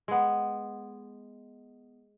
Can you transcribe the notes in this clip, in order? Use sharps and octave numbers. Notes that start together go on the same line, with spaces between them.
G#3 B3